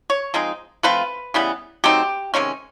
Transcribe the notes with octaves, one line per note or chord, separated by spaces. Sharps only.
C#5
F3 G#3 C4 D#4
F3 A3 C4 F4 B4
C#3 E3 G3 B3
F#3 A3 C4 D#4 G4
C3 D#3 G#3 C#4